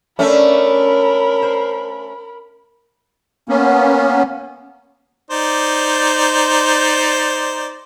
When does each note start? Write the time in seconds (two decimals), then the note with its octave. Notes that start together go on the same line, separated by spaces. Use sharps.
0.19 A3 C#4 D4 A#4 E5 B5
1.42 C5
3.49 A#3 B3 C#4
5.31 D#4 C5 D5